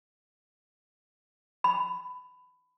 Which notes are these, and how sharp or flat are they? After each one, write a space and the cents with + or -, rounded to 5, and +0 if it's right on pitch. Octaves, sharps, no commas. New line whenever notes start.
B5 +20